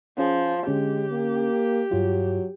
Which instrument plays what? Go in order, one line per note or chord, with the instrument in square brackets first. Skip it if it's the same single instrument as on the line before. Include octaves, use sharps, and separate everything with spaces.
[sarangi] F3 [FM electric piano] C#4 G#4
[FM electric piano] D3 C#4 [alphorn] G#3 [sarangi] G4
[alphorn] A#3
[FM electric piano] G2 F4 [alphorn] F#3